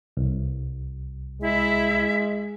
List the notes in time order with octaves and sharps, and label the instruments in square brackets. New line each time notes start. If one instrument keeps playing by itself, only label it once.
[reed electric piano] C2
[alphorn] G#3 [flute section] E4 E5